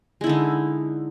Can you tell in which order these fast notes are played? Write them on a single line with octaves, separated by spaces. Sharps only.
G#3 E4 D3 D#4